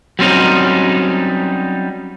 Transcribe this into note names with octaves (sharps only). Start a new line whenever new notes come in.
F#3 G3 C4 C#4 D#4